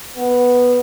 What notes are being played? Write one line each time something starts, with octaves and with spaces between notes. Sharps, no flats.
B3